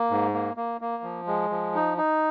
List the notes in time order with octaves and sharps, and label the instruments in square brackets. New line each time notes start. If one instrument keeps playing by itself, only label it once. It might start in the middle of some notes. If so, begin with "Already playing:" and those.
Already playing: [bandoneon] A#3
G#2
A#3
A#3
A#3
F3
G#3
F3
D#4
D#4